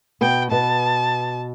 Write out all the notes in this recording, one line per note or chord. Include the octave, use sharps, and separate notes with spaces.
B2 B3 G5
B2 B3 A5